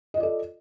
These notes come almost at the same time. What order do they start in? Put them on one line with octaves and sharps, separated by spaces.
D#5 F4 D5 A4